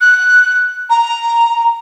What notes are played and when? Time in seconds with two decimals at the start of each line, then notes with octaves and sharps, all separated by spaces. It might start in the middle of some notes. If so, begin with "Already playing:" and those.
0.01 F#6
0.90 A#5